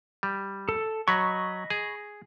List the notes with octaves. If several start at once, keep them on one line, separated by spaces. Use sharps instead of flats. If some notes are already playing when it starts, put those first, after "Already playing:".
G3
A4
F#3 D#5 B5 C#6
G#4